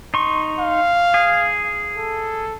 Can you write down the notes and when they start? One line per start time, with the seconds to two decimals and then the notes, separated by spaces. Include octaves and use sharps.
0.14 D#4 C6 C#6
0.59 F5
1.14 G#4
1.98 A4